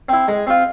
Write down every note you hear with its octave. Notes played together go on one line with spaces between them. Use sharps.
C4 E4
G#3
C4 F4